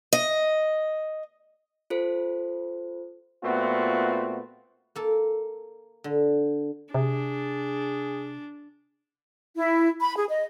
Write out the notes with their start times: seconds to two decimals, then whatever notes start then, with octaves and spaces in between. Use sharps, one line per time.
0.13 D#5
1.90 F4 A4 C5
3.44 A#2 A3 B3 C4 F4 F#4
4.96 A#3 A4
6.04 D3
6.94 C3 D4 G#4
9.56 E4
10.01 B5
10.16 G#4
10.29 D#5